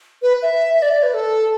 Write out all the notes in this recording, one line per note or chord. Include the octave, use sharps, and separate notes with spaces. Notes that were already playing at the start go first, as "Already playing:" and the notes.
B4
E5
E5
D5
D5
B4
A4